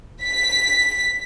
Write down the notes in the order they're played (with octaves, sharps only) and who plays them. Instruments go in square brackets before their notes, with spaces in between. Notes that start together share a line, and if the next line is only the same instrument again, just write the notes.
[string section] B6